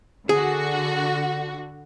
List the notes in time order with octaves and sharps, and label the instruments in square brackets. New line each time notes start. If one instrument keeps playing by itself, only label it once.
[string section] D3 F#4 [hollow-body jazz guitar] G#4